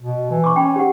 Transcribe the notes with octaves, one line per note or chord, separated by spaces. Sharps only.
B2
E3
C#6 D6
C#4 G5
G4 F#5